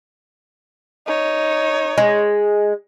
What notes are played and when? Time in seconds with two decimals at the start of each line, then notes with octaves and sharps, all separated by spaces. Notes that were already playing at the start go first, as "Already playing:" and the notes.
1.07 D#4 C#5
1.98 G#3